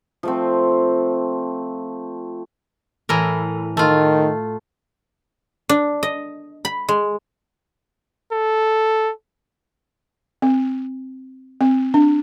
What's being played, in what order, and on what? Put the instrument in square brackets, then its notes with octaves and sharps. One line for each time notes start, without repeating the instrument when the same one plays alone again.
[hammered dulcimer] F3 A3 C4
[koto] A2 E3 A#4
[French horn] D#3 [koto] A3 F4
[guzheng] D4
D#5
B5
G#3
[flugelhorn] A4
[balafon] C4
C4
D4